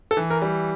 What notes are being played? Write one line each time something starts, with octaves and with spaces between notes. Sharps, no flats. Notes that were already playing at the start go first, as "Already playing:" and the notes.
A4
E3
A#4
G3